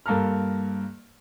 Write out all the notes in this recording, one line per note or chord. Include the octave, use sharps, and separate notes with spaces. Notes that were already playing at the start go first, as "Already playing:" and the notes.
G2 A#3 A4 A#5 F6